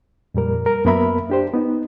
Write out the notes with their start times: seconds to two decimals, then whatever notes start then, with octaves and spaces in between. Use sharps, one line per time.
0.35 F2 A#2 G3 A#4
0.66 A#4
0.85 F#2 A#3 B3 A#4 E5 B5
1.30 D4 G4 C5
1.54 B3 D#4